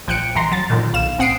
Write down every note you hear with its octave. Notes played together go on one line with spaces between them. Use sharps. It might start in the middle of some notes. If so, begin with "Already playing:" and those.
A#1 F3 G5 F#6 C#7 D7
F#2 E3 A#5 C6
F#3 A6
A#2 D3 D#3 F3
B1 F5 E7
A1 C4 F#5 D#6 C7 D7